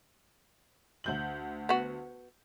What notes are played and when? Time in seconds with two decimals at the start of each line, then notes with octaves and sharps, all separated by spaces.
1.04 D2 G6 F#7
1.69 B3 F#4